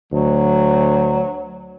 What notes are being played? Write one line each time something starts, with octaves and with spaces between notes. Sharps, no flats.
D2 F#3